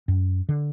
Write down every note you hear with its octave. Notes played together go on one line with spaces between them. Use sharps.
F#2
D3